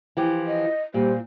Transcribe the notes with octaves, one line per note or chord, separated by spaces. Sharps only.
E3 F3 G4
D#5
A#2 G3 C5